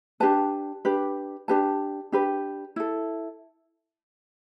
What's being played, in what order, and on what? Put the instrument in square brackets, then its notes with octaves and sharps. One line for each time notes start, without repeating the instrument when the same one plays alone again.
[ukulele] D4 G4 B4 A5
D4 G4 B4
D4 G4 B4 A5
D4 G4 B4
E4 A4